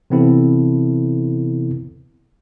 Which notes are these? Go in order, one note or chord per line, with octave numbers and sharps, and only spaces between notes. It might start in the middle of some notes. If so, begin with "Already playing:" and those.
C3 E3 B3 C4 E4 A4